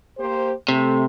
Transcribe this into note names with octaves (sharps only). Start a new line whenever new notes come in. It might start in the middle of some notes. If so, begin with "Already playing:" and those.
A#3 G4 C5
C3 A3